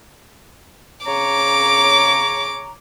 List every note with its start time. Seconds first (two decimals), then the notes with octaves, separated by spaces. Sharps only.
1.07 C#3 C#5 A#5 D6